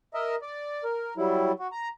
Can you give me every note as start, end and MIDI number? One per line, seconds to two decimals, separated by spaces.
0.14 0.35 70
0.14 0.35 75
0.14 0.35 76
0.42 0.84 74
0.84 1.14 70
1.17 1.52 54
1.17 1.52 55
1.17 1.52 64
1.59 1.67 66
1.72 1.89 82